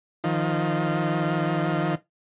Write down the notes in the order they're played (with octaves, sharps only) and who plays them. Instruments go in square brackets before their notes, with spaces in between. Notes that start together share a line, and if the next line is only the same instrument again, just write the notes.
[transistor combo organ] D#3 F3